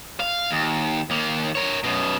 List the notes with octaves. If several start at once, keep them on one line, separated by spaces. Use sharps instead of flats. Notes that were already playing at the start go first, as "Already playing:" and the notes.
F5
D#2
D#2 A#3
A#4 C#5
F#2 B2